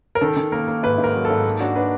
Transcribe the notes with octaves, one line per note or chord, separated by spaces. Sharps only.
A#4
D#3 A4
D#3
A#3 A#4
A#3
G#2 B4
G#2
A#4
F#3
A4
G#2
A#3
D4 F#4
D4 B4